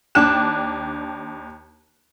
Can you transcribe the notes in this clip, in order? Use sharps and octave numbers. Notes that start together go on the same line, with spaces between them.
D#2 D4 G5 D6 F#6 E7